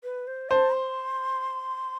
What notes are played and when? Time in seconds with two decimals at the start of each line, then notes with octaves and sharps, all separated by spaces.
0.04 B4
0.27 C5
0.50 C5 A5
0.74 C6